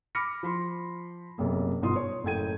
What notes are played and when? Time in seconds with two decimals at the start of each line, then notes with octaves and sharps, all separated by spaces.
0.15 B5 D6 F6 A#6 C#7
0.43 F3 B5 C6
1.38 F#1 B1 C3 A#3
1.82 G1 B2 D#4 F4 C6 D#6
1.96 C#5
2.23 F#1 A2 A3 G5 G#6 D#7